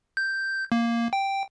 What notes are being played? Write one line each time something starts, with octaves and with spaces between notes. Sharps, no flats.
G6
A#3
G5